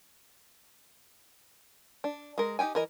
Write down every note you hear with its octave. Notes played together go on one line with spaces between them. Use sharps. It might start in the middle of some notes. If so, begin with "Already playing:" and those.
D4
G#3 A#4
D#4 G4 G5 G#5
E3 A#4 D#5